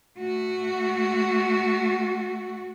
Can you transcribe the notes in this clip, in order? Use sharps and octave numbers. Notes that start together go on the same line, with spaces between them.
A3 F#4